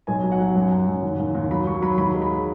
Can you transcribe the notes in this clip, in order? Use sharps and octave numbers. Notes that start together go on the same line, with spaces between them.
B1 G#5
F#3
F#5
F#3
F#2
F#2
F#2
D#2
D#2
D#2
F#3 B5
F#3 C#6
F#3 B5
D#2 B5
G#3
B5